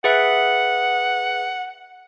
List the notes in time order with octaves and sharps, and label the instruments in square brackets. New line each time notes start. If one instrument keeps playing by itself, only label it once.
[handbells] G#4 B4 E5 [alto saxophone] F#5